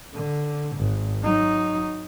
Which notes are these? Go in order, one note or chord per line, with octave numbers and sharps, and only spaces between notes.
D3
G#1
F#3 D#4